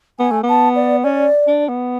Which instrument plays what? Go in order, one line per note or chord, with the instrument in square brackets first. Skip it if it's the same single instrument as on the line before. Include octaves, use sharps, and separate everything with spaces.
[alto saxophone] B3 [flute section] G#5
[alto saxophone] A3
[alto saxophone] B3 [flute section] A5
[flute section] D5
[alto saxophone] C#4 [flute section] D5
[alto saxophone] D4
B3